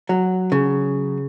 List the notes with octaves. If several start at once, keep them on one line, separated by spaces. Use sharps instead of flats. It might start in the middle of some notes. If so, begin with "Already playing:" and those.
F#3
C#3